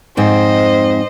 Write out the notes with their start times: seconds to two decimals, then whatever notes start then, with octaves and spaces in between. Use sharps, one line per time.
0.17 F2 G#2 C4 C5 D#5